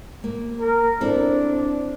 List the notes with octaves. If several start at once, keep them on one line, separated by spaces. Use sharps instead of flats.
A#3
A#4
C4 D4 E4 A4